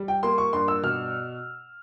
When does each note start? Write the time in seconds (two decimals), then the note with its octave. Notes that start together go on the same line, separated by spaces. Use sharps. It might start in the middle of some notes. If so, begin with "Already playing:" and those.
Already playing: G3
0.08 G5
0.23 A#3 C6
0.38 C#6
0.53 G2 C6
0.68 E6
0.83 B2 F6